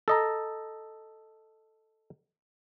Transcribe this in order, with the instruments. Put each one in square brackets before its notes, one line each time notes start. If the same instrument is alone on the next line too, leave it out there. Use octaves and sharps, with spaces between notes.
[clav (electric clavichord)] A4 D#5 A#5